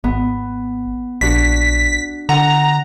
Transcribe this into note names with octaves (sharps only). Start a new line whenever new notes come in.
G#1 B3
A#1 D4 F#4 B6
D3 F#5 A#5